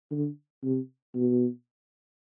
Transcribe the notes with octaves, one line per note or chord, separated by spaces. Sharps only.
D3
C3
B2